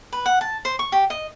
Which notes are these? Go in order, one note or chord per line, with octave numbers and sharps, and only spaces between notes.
B4
F#5
A5
C5
C#6
G4
D#5